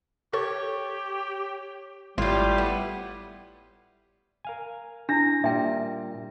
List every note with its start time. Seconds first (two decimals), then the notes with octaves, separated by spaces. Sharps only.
0.33 G4 A4 C#5
2.18 G#1 A2 G3 F4 G4
2.58 B3
4.45 A#4 F5 G#5
5.09 D4 E4 A#6
5.44 A#2 G3 E5 G5